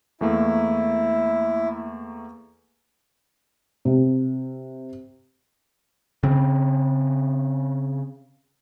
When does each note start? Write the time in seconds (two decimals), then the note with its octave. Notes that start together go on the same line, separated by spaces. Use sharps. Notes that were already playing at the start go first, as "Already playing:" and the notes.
0.21 E2 A3 A#3 E4
3.85 C3
6.23 C#3 C4